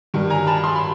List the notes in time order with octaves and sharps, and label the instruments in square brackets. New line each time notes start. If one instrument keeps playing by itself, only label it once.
[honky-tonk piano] G2 D#3 G3
G#5 A#5
A5 B5
C6
B5